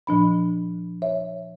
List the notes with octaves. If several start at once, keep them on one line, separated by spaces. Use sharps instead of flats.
A#2 F3 D4 B5
C#5 E5